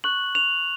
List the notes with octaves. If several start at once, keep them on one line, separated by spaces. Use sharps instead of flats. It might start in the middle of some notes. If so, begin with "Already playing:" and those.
C#6 F#6 F#7
F7